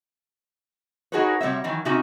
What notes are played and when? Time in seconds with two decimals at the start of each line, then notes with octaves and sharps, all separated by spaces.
1.12 D#4 F#4 G#4 A#4 B4 C#5
1.41 C3 G3 C#5 E5
1.64 D#3 E3 F#3
1.85 C3 C#4 D#4 F#4 E5